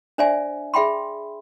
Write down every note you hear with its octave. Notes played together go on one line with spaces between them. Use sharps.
D4 C5 D5 E5 G#5
G#4 E5 G5 B5 C6